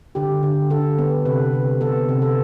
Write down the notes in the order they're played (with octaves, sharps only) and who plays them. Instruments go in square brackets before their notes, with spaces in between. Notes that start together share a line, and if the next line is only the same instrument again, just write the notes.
[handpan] D3 G4
D3
D3 A4
B3
C3 B4
C3
B3 A4
C3
A4